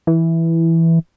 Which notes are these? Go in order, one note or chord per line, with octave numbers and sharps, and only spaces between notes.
E3